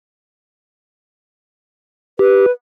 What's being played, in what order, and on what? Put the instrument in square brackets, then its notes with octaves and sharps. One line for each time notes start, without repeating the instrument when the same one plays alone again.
[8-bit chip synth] G4 [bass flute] B4